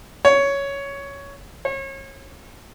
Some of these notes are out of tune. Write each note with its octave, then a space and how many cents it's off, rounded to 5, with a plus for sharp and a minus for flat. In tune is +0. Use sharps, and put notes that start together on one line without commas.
C#5 +10
C#5 -35